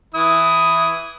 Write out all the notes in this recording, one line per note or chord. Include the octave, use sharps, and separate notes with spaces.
E3 E4 D#6